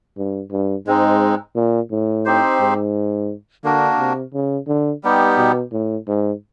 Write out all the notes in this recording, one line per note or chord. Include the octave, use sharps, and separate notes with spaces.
G2
G2
G#2 G#3 C4 D#4
A#2
A2
C4 D#4 G4 C5
G#2
D3 A#3 D4 F#4 A#4
C3
C#3
D3
G3 B3 D#4 G4
B2
A2
G#2